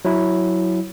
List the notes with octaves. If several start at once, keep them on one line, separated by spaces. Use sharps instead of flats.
F#3 E4